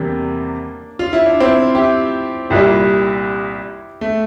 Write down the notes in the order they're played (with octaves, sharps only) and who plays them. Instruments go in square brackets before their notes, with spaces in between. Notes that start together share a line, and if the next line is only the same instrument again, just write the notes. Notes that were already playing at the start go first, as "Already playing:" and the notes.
Already playing: [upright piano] E2 C3 G3 [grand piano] A#3 D4
[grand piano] F4
E4
D4
C4 E4
E4 G4
[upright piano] C2 A#2 G3 [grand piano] E4 G4
[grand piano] A3